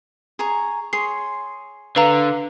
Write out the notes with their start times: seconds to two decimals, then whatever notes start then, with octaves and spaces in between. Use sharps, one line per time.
0.39 G#4 A#5 C#6
0.93 G#4 C#5 C6 C7
1.96 D3 B4 F5 A#5